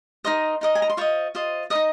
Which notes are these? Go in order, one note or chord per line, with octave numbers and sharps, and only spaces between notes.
D#4 A#4 D#5 C6
D#4 A#4 D#5
G#5
A#5
C6
F4 C5 D#5 C#6
F4 C5 D#5
D#4 A#4 D#5 D#6